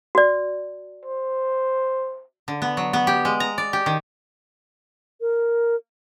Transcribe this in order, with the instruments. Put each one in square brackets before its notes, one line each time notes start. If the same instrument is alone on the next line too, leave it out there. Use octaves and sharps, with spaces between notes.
[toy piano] F#4 D5
[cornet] C5
[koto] D3
B3
F#3
B3
G4
G#3
A#5
D5
G4
D#3
[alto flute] A#4